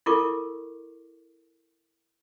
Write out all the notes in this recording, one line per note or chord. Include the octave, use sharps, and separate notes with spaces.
E4 F4 A4 A#4 C#6 D6